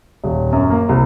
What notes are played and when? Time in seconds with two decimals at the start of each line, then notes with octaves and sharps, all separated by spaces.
0.24 D#1
0.52 F#2
0.70 A#3
0.89 C2